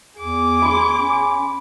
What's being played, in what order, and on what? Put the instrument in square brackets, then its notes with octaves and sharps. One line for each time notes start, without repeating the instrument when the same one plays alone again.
[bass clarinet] E2 [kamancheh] G#4 D6
[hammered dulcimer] B5 C6
[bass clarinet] C#4